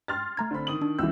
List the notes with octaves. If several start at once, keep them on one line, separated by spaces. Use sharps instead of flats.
C6 F6 A6
A3 A#5 G#6
D3 C4 B5
D#3 D#6 F#7
D4
C#2 E3 E6 G6